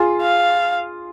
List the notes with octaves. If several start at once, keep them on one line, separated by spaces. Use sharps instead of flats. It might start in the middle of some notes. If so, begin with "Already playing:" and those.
Already playing: F4 G#4
F5